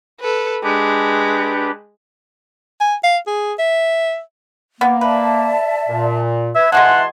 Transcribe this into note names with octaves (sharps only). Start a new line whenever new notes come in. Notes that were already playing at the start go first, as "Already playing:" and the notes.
A4 B4
G#3 D4 G4 B4
G#5
F5
G#4
E5
A#3 B3
B4 D5 E5 A5
A#2
B4 E5 G#6
E3 G#3 F#4 G#4 E5 F#5 A5 C6